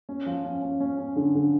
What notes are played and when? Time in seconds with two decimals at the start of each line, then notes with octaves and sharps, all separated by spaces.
0.09 C#4
0.26 F3
0.44 C#4
0.62 C#4
0.80 C#4
0.98 C#4
1.16 D3
1.35 D3